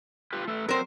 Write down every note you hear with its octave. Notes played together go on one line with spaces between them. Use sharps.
F4 G4 B4
A3 A4 B4
F#3 C4 A#4 C5